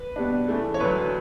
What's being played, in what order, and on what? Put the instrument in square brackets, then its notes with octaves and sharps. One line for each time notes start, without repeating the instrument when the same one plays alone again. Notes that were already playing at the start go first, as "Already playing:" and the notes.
Already playing: [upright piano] B4
B2 G3 B3 D4
C#3 E3 A3
C#5
D2 D3 F#3 B4